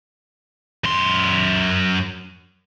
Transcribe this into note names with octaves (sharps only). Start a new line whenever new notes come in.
F#2 C6